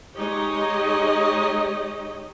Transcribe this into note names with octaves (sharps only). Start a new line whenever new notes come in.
G#3 D#4 G4 C#5 D#5